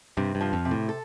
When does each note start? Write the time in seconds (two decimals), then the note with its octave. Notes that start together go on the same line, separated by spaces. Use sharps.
0.17 G2 C3
0.35 G2
0.41 F3
0.53 F2
0.65 C3
0.71 A2
0.89 A4